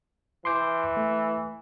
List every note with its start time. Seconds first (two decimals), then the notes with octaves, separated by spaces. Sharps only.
0.45 E3 C6 D6 G6
0.97 A3